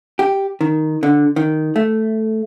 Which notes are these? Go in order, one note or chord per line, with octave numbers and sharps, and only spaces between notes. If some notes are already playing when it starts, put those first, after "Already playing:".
G4
D#3
D3
D#3
A3